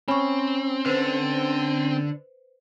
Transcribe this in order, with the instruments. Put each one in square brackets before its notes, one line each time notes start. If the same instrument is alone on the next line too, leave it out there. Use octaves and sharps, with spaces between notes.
[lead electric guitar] C4 [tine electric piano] C#4 [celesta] B5 C#6
[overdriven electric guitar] D3 [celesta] B4 C5